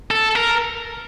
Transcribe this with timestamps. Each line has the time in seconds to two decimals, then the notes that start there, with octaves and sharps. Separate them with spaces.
0.11 A4
0.36 A#4